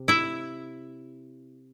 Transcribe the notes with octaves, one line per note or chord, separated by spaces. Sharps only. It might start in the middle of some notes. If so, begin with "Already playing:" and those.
Already playing: C3
E4 E5